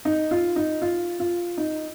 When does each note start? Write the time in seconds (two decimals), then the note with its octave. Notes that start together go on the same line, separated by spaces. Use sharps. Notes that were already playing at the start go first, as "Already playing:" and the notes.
0.05 D#4
0.31 F4
0.56 D#4
0.82 F4
1.20 F4
1.58 D#4